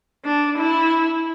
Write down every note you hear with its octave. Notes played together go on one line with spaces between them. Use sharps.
D4
E4